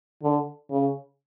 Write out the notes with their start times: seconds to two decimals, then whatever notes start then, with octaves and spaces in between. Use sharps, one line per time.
0.22 D3
0.71 C#3